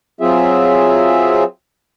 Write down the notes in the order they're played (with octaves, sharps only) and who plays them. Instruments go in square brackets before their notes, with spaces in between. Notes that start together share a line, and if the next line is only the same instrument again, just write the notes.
[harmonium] F#3 C4 F4 G#4 E5